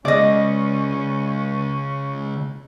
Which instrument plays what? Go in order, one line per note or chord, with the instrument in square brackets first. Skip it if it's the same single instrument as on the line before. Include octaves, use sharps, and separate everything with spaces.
[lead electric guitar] C#3 G#3 [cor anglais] C#4 [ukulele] D5 D#5